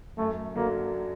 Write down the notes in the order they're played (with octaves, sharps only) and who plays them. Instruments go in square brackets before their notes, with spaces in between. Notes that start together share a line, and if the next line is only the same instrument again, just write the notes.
[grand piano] F#2 [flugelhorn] A3
[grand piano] D3 F#3 [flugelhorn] A#3